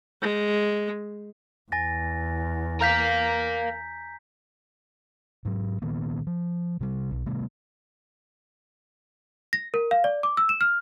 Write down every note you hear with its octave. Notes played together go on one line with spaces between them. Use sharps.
G#3
E2 G#5 A6 A#6
A#4 F5 A#5 G6 B6
G#2 F#3
A#2 D#3 A#3 B3
F3
C3 G3
B1
C3 G3 A3 B3
A#6
A#4
F5
D5
D6
E6
E7
F6